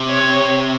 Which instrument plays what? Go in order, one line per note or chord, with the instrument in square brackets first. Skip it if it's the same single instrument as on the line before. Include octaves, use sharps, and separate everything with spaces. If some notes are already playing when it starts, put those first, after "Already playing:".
Already playing: [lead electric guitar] C3
[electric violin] C#5